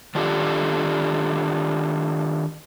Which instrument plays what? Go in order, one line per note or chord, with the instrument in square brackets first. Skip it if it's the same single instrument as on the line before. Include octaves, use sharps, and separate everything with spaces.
[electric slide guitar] D#3 D4 F4 G4 A4